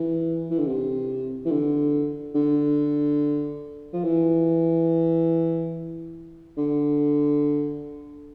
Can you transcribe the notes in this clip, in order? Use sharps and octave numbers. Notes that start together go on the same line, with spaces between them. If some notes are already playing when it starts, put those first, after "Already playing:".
Already playing: E3
E3
D3
C3
E3
D3
D3
F3
E3
D3